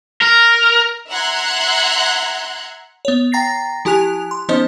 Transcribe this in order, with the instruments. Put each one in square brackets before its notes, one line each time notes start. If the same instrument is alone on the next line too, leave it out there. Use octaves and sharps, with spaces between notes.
[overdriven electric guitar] A#4
[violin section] E5 F#5 A#5 C6 F#6 G#6
[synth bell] B3 C#5
G5 A#5 A6 A#6 C7
F3 E4 G4 G#5 F#6 F7
C6
F3 B3 C#4 D#4 C5 D#5